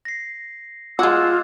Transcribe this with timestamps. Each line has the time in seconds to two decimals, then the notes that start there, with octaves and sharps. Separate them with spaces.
0.05 A#6 C7
0.99 G#3 F4 F#4 D6 E6 F#6 G#6